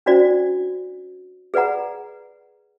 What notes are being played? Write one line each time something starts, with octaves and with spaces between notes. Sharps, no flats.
C#4 D4 E4 F#4 C5 D5
G#4 B4 D5 F#5 A#5